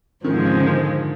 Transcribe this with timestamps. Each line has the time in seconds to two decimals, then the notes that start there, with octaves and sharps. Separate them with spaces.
0.24 G#2 D#3 F3 G#3
0.34 D3
0.45 C#3
0.54 D3
0.64 D#3